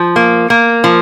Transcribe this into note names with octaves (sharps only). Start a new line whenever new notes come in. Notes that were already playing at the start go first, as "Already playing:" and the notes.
Already playing: F3
A#3
A#3
F3